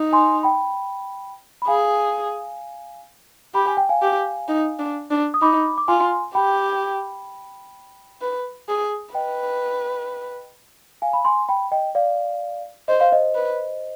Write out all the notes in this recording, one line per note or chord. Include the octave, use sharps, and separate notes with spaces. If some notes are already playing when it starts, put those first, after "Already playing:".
Already playing: D#4
G#5 C6
G5 B5
B5
G#4 F5 G#5
G4 B5
G#5
G5
F5 G#5
G4
D#4
D4
D4
D#6
D#4 B5 D6
D6
F4 G#5 C6
G4 G5 B5
B4
G#4
B4 D#5 G5
F5 G#5
B5
G#5 C6
G5 B5
D#5 G5
D5 F5
C5 D#5
F5
C5 D#5
B4